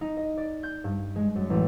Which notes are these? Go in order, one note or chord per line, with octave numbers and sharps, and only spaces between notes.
D#4
D#5
D5
G6
G2
G#3
F#2
A1